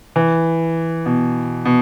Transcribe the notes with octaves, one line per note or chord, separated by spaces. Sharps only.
E3
B2
B2